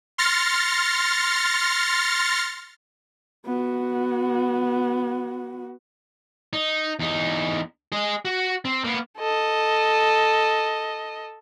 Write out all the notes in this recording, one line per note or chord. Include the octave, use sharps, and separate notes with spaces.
C6 F6 A6 A#6 C#7
B3 F#4
D#4
E2 D#4
G#4 D#5
F#4
C4
A#3 B3
A4 D#5